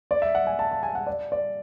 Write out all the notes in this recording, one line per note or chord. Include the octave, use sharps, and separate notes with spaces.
D5
E5
F#5
G#5
A5
A5
G#5
F#5
D5
D5